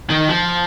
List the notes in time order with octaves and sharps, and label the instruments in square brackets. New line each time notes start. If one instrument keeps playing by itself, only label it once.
[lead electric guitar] D#3
F3